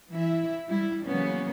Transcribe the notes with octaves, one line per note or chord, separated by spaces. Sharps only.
E3 E4 E5
G3 E4
C#3 E3 F#3 A#3 B3 C#4